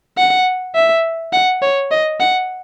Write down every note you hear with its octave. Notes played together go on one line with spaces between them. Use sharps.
F#5
E5
F#5
C#5
D#5
F#5